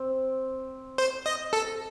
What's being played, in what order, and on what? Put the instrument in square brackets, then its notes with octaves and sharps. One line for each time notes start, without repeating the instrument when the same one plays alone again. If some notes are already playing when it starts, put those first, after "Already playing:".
Already playing: [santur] C4
[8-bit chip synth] C5
D#5
A4